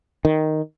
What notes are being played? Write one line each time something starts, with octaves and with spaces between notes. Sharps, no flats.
D#3